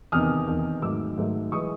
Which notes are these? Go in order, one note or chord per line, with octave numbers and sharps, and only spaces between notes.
E2 C3 D#3 D#6 F6
E2 C3 D#3
G#2 D#3 F#3 A3 D6 E6
G#2 D#3 F#3 A3
E3 G#3 C#6 D#6